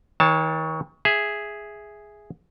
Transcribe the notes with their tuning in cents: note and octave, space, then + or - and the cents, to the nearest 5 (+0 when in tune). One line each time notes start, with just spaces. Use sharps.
D#3 +40 C#5 +0 A5 +5
G#4 +0 E5 +0